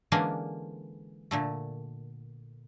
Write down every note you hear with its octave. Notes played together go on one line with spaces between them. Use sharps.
D3 E3 G#3 A#3 C#4 D4
A#2 D3 A3